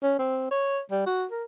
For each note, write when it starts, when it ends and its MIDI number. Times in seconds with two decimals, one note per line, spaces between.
0.03 0.15 61
0.19 0.50 60
0.51 0.80 73
0.91 1.06 55
1.06 1.25 66
1.31 1.44 70